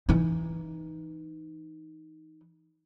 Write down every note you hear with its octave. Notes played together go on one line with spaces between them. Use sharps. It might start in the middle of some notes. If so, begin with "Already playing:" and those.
E3 D#4